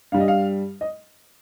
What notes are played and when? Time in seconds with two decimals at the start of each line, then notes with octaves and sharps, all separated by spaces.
0.12 G2 G3 F5
0.20 D#5
0.28 F5
0.81 D#5